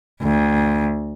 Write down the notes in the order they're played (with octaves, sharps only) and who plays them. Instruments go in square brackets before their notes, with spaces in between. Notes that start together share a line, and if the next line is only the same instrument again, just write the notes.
[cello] D2